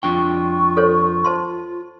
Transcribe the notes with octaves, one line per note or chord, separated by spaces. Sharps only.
F2 D4 F4 G5 C#6
A4 C5 C#5
C5 A5 C6